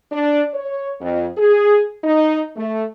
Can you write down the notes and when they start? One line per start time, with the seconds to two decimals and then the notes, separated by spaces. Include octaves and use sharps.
0.12 D4
0.54 C#5
1.01 F2
1.38 G#4
2.04 D#4
2.56 A3